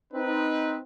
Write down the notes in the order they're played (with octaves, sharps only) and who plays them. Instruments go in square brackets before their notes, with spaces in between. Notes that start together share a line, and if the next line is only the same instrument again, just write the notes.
[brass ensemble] C4 D#4 B4